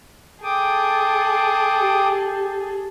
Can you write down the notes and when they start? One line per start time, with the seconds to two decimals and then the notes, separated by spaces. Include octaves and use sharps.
0.43 G#4 A4 G5 D6 D#6
1.81 G4